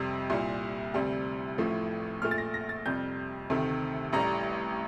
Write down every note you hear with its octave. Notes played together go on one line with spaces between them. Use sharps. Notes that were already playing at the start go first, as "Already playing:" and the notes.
Already playing: F2 C3 G3
C2 A#2 G3
D2 C3 G3
A1 A2 F3 A3
A#1 A#2 A3 F6
A6
A#6
A#6
A6
F2 C3 G3 G6
D2 C3 D#3 A3
A1 A2 G3 A#5